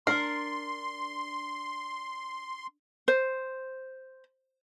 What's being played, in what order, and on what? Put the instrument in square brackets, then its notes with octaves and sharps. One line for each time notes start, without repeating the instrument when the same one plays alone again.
[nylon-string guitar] D4 [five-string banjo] A#4 [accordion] C6 [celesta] C7
[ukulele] C5